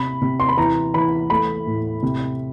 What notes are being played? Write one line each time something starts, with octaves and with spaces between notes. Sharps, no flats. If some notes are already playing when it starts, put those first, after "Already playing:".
Already playing: C3 B5
C3
C6
B5
E3 A#5
E3 B5
A3 B5
A2
C3